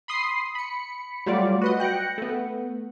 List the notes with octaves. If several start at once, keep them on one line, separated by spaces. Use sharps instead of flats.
B5 C6 D#6 C7
B5 C#7
F#3 G3 A3 F4 D5
F#4 B4 D#5
G5 F#6 A#6 C#7
A3 B3